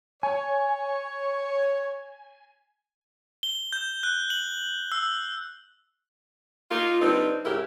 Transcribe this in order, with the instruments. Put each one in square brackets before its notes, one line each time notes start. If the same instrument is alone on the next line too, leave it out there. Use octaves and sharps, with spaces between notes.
[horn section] C#5 [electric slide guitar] G#5
[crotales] G7
G6
F#6
F#7
E6
[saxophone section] A#3 D#4 F4
D3 G3 C4 D#4 B4
G#2 C#3 E4 G4 A#4